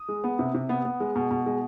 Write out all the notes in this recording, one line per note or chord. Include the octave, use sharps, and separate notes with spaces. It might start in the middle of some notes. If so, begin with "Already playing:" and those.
Already playing: D#6
G#3
B3
C3
C3
B3
B3
G#3
B2
B2
G#3